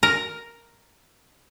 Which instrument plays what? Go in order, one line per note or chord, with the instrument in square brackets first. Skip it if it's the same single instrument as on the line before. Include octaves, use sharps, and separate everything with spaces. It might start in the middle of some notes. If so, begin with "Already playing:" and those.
[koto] A#4